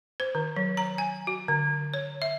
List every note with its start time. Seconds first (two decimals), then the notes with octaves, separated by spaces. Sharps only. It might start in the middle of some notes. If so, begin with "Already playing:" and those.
0.20 C5
0.35 D#3
0.56 F#3
0.77 A#5
0.98 G#5
1.27 F#4
1.48 D3
1.94 C#5
2.22 E5